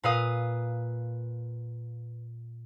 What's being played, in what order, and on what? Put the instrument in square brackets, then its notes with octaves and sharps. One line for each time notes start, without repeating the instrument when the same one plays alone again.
[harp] A#2 B4 F5 D#6